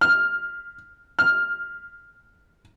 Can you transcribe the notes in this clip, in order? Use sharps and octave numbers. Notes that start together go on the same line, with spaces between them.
F6
F6